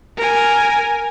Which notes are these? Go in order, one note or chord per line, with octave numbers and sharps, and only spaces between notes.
A#4 G#5